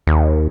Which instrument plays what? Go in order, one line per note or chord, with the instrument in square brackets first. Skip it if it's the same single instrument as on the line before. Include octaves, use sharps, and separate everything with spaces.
[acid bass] D#2